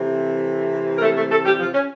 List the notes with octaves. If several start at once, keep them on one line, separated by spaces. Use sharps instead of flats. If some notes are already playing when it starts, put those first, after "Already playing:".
Already playing: C3 E3 A3 C4
A#4
A3 A4
A3 A4
A3 A4
G3 G4
F3 F4
C#4